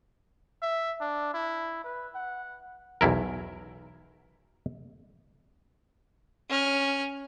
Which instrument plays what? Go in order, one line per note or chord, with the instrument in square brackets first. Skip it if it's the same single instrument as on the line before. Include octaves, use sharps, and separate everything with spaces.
[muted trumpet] E5
D4
E4
B4
F#5
[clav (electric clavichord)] B1 E2 E4 A#4
[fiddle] C#4 F6